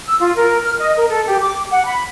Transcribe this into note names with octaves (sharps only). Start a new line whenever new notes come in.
E6
F4
A#4
F6
D#5
A#4
A4
G4
D6
F#5
B5